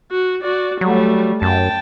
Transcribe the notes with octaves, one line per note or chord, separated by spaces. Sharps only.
F#4
F#4 D5
F#3 G3 A3
F#2 G5 A5